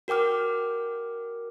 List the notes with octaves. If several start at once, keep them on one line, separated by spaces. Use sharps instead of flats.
F#4 A#4 G5 D6 F6